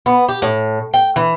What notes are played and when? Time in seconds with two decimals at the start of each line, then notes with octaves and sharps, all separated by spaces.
0.06 B3
0.28 G4
0.42 A2
0.93 G5
1.16 E3